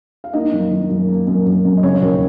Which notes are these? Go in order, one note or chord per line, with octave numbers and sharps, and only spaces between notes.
F5
A#3 D#4 D#5
F#2
D#3
F#2
A#3
F#2
F#2
F#2
D#5
C#3 C#4 C#5
D#2